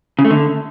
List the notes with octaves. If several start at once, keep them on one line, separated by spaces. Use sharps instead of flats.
C#3
A3
D3